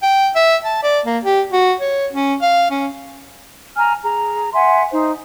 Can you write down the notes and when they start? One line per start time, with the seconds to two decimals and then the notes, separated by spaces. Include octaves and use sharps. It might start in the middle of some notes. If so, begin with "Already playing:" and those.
0.02 G5
0.35 E5
0.64 A5
0.83 D5
1.06 A#3
1.24 G4
1.52 F#4
1.80 C#5
2.13 C#4
2.41 F5
2.71 C#4
3.76 G#5 A#5 F6
4.03 G#4 A#5
4.53 E5 F#5 G#5 C6
4.91 D#4 C5